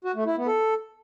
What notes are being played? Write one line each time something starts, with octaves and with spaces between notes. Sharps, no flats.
F#4
A3
E4
B3
A4